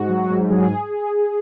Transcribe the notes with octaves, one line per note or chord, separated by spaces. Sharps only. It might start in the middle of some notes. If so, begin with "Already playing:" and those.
Already playing: G#2 F#4
F#3
G#2
F#3 G#4